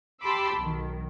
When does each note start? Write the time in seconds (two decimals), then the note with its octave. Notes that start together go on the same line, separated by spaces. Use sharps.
0.22 G4 A5 B5 C6 D6 E6
0.56 B1 D#3